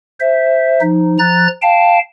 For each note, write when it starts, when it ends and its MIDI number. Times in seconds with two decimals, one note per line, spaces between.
0.20 0.81 72
0.20 0.81 76
0.81 1.18 53
0.81 1.18 63
1.19 1.47 53
1.19 1.47 82
1.19 1.47 90
1.19 1.47 93
1.62 1.99 77
1.62 1.99 79
1.62 1.99 81